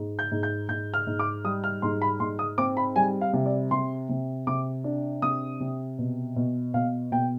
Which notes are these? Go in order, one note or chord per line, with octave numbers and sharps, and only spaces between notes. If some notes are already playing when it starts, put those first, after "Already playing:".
Already playing: G#2
G6
G#2
G6
G#2 G6
F6
G#2
D6
G3 D#6
F6
G#2 C6
B5
G#2 C6
D#6
C4 D6
B5
G3 G#5
F5
C3
D5
C3 C6
C3
C3 D6
D4
C3 D#6
C3
B2
B2
B2 F5
B2 G5